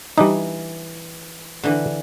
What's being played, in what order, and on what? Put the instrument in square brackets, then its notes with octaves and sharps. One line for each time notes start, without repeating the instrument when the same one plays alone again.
[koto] E3 [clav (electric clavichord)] G3 D4 D#4
[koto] D3 E3